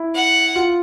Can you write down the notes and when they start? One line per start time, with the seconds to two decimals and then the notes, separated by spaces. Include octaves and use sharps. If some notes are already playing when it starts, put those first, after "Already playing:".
Already playing: E4
0.15 F#5
0.56 F4